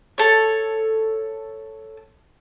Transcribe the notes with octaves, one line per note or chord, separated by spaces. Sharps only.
A4 C#5